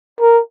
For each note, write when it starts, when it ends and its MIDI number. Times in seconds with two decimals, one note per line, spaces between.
0.21 0.40 70